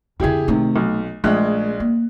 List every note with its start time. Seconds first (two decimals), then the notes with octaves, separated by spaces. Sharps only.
0.20 F2 D3 E4 G4 G#4
0.48 C3 D#3 A3 D#4
0.76 B1
1.24 A#1 G#3 A3 F#6
1.80 A#3